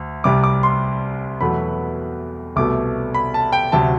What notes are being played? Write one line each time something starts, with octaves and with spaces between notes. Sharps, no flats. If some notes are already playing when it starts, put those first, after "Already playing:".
Already playing: D2
C2 C3 G3 D6
D6
C6
E2 B2 F#3 A3 B5
C2 B2 A3 D6
B5
A5
G5
D2 C3 F#3 A5